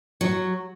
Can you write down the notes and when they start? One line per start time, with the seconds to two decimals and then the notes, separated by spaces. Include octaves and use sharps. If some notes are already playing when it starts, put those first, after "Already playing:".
0.21 F#3